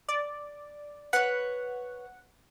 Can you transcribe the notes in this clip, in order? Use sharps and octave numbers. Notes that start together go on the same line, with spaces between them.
D5
B4 C#5 F#5